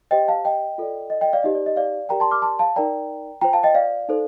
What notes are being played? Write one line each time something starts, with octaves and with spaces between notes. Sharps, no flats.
G4 C5 D#5 G5
F5 A5
D#5 G5
F4 A4 D5
D#5
D#5 G5
D5 F5
D#4 G4 C5 D#5
D5
D#5
D5 F5
G4 A#4 D5 G5 A#5
A5 C6
D6 F6
A5 C6
F5 A5
D#4 A#4 D5 G5 A#5
F4 C5 G5 A#5
F5 A5
D#5 G5
D5 F5
D#4 A4 C5